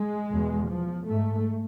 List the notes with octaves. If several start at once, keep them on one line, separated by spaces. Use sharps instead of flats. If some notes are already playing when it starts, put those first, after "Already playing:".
Already playing: G#3
E2 B2
F3
G#2 A3